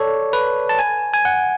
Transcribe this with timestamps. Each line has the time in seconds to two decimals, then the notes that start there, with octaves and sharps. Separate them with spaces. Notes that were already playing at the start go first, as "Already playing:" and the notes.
Already playing: A4 C#5 D5
0.33 B4
0.69 A5
0.79 G#5
1.14 G#5
1.25 F#5